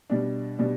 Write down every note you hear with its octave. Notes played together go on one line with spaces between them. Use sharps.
B2 G3 D4
B2 G3 D4